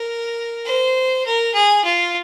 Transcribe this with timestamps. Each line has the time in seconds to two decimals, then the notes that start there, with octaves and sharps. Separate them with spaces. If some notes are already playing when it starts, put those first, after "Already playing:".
Already playing: A#4
0.66 C5
1.26 A#4
1.54 G#4
1.84 F4